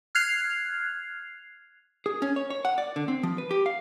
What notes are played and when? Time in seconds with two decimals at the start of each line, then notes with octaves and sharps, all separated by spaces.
0.15 F6 F#6 G#6 C7 F7
2.06 G#4
2.22 C#4
2.36 C#5
2.50 C#5
2.65 F#5
2.78 D5
2.96 D3
3.08 C4
3.23 F3
3.38 B4
3.51 G4
3.66 F5